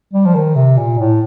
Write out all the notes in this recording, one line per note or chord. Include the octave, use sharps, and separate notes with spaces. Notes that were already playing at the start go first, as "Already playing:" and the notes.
G3
F3
D#3
C3
A#2
A2